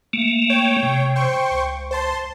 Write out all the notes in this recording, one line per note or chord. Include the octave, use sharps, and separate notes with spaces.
A3 A#3
C#5 G5
C3
C5 G5 C#6
C#2
C5 A5 C6